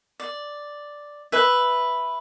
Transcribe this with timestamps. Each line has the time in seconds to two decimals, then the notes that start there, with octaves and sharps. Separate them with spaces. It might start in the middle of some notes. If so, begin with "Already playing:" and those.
0.20 D5
1.32 B4 E5